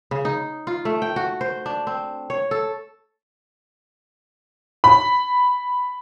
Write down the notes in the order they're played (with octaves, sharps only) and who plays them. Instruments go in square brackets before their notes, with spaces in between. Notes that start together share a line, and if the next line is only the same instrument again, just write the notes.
[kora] C#3
D#4
F4
A3
G5
F#4
C5
D4
C4
C#5
A4
[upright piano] B5